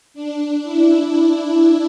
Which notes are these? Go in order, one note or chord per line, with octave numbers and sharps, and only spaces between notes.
D4
E4